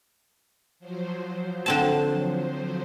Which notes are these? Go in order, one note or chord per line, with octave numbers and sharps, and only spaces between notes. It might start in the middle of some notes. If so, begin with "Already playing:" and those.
F3 F#3 C5
D3 C4 A5